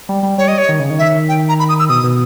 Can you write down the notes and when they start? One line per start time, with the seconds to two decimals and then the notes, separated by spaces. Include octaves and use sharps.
0.09 G3
0.23 G3
0.38 G3 C#5
0.48 D#5
0.58 C#5
0.69 D#3
0.79 C#3
0.90 D#3
0.99 E5
1.29 G5
1.49 A#5
1.59 B5
1.69 D#6
1.79 E6
1.89 B2 D#6
2.04 B2